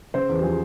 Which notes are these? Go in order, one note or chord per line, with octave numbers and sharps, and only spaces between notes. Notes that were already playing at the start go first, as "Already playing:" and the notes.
C#3 C5
E2
G4
F3 G#4